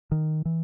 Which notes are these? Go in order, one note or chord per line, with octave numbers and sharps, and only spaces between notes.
D#3
E3